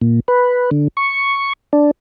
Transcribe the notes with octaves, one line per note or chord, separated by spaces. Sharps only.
A#2
B4
D3
C#6
D4